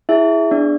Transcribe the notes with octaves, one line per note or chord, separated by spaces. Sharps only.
E4 G#4 E5
B3 D4 D5